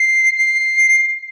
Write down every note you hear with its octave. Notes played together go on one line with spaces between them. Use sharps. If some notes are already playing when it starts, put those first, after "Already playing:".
Already playing: C7
C7